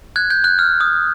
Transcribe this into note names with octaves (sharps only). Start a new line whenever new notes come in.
F#6 G#6
G6
F#6
F6
D#6